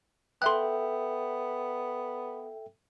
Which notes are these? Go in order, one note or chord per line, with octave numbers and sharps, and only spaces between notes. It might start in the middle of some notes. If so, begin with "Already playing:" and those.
B3 A4 E5 G5 C6 F#6